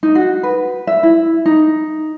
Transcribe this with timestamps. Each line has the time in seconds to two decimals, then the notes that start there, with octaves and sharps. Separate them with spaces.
0.03 D#4
0.15 F#4
0.43 B4
0.87 E5
1.03 E4
1.46 D#4